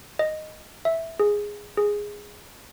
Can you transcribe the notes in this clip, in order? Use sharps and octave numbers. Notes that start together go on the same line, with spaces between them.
D#5
E5
G#4
G#4